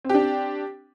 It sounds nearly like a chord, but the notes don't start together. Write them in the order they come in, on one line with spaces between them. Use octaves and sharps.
C4 G4 D4